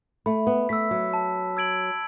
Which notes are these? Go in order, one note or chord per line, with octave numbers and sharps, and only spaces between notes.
A3 B5
B3
A3 E6 B6
F#3
A5
E6 G#6 D7 F#7